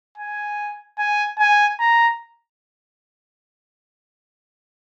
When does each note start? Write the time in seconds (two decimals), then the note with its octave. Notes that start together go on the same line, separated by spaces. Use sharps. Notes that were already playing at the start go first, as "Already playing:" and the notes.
0.18 G#5
0.98 G#5
1.39 G#5
1.80 A#5